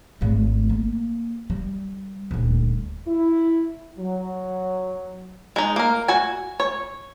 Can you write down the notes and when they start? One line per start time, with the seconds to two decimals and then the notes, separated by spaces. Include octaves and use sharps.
0.21 G#1 A3
0.70 A#3
1.50 G3
2.31 D#1 D2
3.07 E4
3.98 F#3
5.56 G#3 D#4
5.76 A#3 A#4
6.08 F#4 G#5
6.60 C#5